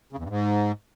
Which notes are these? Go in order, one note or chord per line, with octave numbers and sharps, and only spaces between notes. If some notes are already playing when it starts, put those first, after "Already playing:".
C#3
E2
G2
G#2